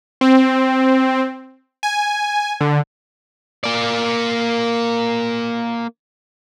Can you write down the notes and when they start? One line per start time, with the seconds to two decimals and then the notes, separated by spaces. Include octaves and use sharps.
0.21 C4
1.83 G#5
2.61 D3
3.64 A#3 D5